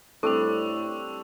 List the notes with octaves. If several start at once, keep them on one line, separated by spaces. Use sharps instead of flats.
A2 G3 C4 D4 A4 C#6 E6 F7